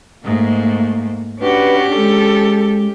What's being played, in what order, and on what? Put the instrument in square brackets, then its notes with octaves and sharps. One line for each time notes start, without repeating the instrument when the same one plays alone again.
[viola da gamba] G#2 [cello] A3 A#3
[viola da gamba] C#4 G4 [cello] D4 F#4 [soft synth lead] B4
[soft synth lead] G#3 [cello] A4